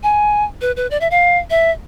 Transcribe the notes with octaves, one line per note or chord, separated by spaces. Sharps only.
G#5
B4
B4
D5
E5
F5
E5